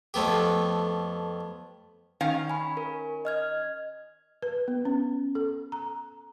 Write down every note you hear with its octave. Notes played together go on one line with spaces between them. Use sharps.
F2 A3 B3 G4
D#3 C#4 F5
G#5 B5
A#4
D#5 F6 G#6
B4
B3
C#4
A4
A#5